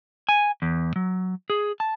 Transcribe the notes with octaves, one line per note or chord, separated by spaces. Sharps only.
G#5
E2
F#3
G#4
A5